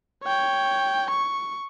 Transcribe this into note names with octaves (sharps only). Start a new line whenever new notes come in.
C#5 G5
C#6